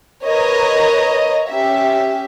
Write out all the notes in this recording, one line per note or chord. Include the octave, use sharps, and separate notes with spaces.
A#4 B4 C#5 D#5 A#5
C#4 G4 E5